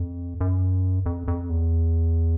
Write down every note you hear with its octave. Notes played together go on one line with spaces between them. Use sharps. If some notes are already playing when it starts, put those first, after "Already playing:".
Already playing: F2
F#2
F2
F2
E2